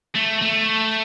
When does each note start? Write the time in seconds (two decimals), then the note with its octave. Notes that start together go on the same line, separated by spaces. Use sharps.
0.15 A3
0.42 A3